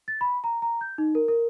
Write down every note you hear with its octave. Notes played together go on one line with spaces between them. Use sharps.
A6
B5
A#5
A#5
G6
D#4
A#4
A#4